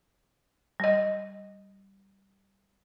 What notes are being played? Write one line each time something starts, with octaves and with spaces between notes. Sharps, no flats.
G3 D#5